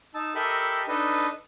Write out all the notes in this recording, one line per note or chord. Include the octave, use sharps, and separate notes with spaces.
D#4 A5 E6
G4 A4 A#4 D#5 E5 B5
D4 D#4 A4 B4 D#5